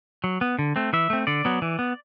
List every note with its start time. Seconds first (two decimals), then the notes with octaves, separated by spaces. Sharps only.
0.24 F#3
0.41 B3
0.59 D3
0.76 A3 C4
0.93 E3 E5
1.10 A3 C4
1.27 D3 D5
1.45 F#3 B3
1.62 E3
1.79 B3